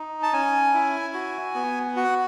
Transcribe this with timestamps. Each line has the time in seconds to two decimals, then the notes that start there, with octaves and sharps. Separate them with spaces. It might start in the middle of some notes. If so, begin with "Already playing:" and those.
Already playing: D#4
0.23 A5
0.33 C#4 G#5
0.74 E4
1.14 F#4
1.55 B3
1.96 F#4 F#5